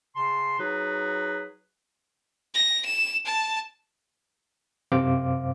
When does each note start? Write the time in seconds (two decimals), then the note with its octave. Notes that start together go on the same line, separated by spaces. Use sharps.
0.16 C#3 A5 C6
0.59 F#3 D#4 F#4 G#4 B4
2.54 A#6
2.86 E7
3.26 A5
4.92 F#2 C3 C5 F5 D6